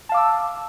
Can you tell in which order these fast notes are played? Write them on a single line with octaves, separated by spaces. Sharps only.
A5 F5 D6 E6